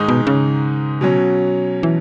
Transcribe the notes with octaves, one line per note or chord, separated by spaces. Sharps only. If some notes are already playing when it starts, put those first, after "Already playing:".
Already playing: G#2 D#3 G#3 D#4
B2
C#3
B2 F#3 C#4
E3